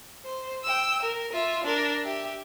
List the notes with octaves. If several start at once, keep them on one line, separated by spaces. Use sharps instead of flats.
C5
G5 E6
A#4
F4 E5
D4 A#4
G4 E5